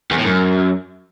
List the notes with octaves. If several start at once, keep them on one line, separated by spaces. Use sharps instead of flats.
E2
A2
F#2